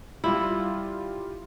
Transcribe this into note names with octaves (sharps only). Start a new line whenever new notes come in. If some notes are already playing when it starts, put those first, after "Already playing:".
G3 E4 F4 G4